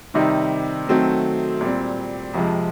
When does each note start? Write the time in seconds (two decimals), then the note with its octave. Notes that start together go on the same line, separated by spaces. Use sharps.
0.14 C3 D#3 G3 C4 D#4
0.87 D#3 F#3 A3 C4 D#4
1.61 A#2 G3 C4
2.34 F2 C3 F3 G#3